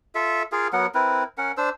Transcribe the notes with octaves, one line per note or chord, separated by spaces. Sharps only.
F4 A4 E5
F4 G#4 A#4 F5
F#3 B3 A#4 F#5
C4 E4 A#4 B4
C#4 A#4 F#5
D4 C5 E6